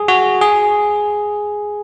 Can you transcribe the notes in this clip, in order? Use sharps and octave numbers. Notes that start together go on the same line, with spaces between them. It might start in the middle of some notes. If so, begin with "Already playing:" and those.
Already playing: G#4
F#4
G#4